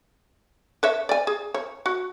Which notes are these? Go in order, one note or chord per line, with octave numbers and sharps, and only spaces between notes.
B4 C#5 E5
D5 G#5
G#4
C#5
F#4